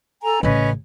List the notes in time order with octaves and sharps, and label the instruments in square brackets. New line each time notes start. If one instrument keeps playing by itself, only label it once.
[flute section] A4 G#5 A#5
[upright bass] A1 C#3 [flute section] C#4 B4 D#5